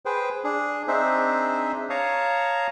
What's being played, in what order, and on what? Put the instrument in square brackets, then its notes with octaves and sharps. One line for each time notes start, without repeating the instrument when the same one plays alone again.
[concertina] G#4 B4 C5 G5
D4 G#4
C4 D4 D#4 G#4 C5 E5
C#5 F5 A5 A#5 C#6 D#6